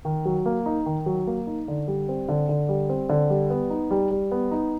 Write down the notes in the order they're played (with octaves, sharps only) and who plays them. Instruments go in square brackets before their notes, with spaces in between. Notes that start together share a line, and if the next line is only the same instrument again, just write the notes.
[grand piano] D#3
F#3
A#3
D#4
D#3
F#3
A#3
D#4
D3
G3
C4
D3
D3
G3
C4
D3
G3
B3
D#4
G3
G3
B3
D#4